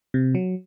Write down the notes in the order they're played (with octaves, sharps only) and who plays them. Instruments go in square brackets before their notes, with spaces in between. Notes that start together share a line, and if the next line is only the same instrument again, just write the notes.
[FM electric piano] C3
F#3